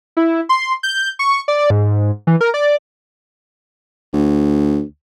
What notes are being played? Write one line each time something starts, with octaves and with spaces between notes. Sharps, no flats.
E4
C6
G6
C#6
D5
G#2
E3
A#4
D5
D2